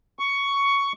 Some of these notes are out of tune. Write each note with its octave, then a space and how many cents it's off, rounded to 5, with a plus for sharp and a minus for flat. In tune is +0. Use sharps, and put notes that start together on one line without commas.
C#6 +10